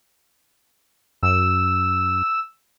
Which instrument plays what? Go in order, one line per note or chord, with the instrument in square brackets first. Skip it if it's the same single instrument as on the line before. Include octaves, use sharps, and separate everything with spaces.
[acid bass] F#2 [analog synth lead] E6